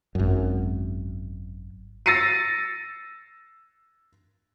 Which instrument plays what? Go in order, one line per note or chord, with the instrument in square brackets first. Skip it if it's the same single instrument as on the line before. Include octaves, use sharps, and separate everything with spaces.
[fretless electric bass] G#1 F#2
[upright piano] E6 A6 A#6 C7 C#7 D#7